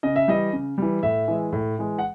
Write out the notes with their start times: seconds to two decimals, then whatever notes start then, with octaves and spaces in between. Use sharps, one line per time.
0.03 C#3 D#5
0.16 E5
0.28 E3 G3 D#5
0.53 C#3
0.78 E3 G3
1.03 A2 E5
1.28 E3 G#3
1.53 A2
1.78 E3 G#3
1.99 F#5